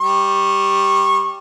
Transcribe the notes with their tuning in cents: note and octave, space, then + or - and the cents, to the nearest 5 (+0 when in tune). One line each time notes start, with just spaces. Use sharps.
G3 +0 C#6 -25